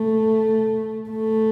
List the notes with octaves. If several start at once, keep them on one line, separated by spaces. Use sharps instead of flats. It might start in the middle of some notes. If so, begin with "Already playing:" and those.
Already playing: A3
A3